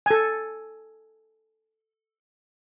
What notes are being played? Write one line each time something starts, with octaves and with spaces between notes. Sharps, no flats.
A4 G#5